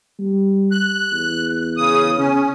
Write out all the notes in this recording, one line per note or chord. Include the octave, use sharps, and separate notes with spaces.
G3
F#6
E2
C#3 D#6
C#3 C#4